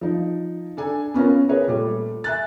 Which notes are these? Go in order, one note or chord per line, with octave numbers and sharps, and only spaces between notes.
F3 D#4
D4 A4 G#5
B3 C#4 F4 A#4
G#4 A#4 B4 C#5
A#2 G3 A3
E5 G#5 F#6 A6